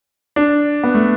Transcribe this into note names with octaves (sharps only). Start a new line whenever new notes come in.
D4
B3
A3